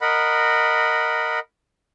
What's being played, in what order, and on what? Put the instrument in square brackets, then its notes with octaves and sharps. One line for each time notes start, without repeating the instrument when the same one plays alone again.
[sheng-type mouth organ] A#4 D#5 F#5 B5